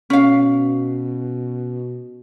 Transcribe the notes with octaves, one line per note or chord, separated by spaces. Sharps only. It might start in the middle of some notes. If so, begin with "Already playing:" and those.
B2 C#4 F5